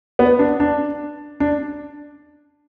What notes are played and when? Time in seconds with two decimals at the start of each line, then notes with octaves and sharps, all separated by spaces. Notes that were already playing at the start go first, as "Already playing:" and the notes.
0.19 B3
0.39 D4
0.60 D4
1.40 D4